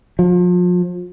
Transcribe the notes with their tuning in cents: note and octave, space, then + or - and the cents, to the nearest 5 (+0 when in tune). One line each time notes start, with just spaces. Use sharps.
F3 +35